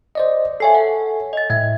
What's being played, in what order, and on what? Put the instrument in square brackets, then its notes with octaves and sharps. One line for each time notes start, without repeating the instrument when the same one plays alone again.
[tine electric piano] C5 D5 D#5
[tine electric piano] A4 C#5 [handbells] E5 G#5 C7
[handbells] F#5
D#5 A6
[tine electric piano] A2 E5 [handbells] G#6